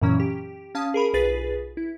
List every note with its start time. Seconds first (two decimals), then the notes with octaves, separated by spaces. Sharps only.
0.02 F#2 A#2 E3 F#3 C#4
0.20 G4
0.75 C#4 F5 A5 D#6
0.94 G#4 A#4 B5
1.14 B1 F4 G#4 B4 A6 B6
1.77 E4